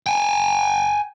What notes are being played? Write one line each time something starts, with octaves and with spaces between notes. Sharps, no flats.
G5 G#5